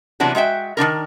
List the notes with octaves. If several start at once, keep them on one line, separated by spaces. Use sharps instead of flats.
C3 E3 F#3 B3 D4
G#3 F#4 E5 G5
D#3 F3 D4 A#4